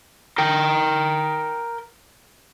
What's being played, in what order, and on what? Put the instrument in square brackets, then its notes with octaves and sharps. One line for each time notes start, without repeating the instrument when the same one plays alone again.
[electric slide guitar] A#4 G5